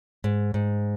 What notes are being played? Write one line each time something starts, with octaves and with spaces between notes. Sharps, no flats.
G#2
G#2